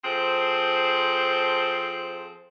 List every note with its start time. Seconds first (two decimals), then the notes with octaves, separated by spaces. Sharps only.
0.04 F3 C4 G#4 A4 C5